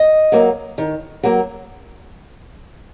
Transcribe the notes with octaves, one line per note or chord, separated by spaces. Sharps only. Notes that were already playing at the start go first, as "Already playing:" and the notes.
Already playing: D#5
F#3 A#3
D#3
F#3 A#3